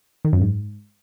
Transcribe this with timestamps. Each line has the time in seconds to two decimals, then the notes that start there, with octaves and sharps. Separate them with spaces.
0.25 D#3
0.33 F#2
0.41 G#2